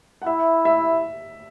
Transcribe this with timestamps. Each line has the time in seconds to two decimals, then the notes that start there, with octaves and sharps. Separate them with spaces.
0.22 F#5
0.26 E4 E5
0.65 E5